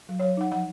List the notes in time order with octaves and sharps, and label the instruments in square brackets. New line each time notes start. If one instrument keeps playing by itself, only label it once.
[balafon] F#3
F#3 C#5
D#4 F#5
F3 F#5